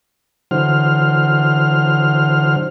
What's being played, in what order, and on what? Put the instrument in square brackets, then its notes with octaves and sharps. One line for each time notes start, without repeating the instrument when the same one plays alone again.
[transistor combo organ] D3 E3 F#3 C5 F6